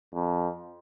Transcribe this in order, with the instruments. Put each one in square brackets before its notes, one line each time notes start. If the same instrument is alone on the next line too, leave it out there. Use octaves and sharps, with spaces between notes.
[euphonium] F2